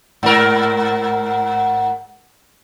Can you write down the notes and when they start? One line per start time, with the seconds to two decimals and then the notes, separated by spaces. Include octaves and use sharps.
0.23 G#2 A#4